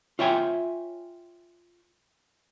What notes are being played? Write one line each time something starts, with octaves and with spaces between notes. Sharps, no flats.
F4 C#5 E5 G5 G#5